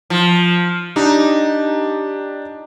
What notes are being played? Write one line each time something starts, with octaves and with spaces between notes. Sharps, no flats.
F3
D4 D#4 G4